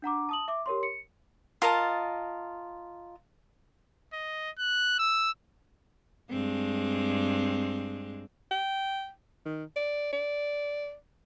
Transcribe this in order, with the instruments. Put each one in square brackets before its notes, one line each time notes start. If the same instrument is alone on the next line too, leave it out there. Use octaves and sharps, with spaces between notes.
[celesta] D4 F#5 A#5 D6
A5 D#6 F#7
E5 D6
G4 A#4 C#5 C6
C#7
[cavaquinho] F4 A#4 D#5 A5
[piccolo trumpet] D#5
F#6
E6
[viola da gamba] G2 G#3 C4
[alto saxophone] G5
D#3
D5
D5